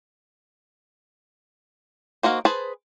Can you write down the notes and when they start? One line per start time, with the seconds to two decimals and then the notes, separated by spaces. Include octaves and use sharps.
2.23 A#3 D#4 F#4 C5
2.45 G#4 B4 C5 A5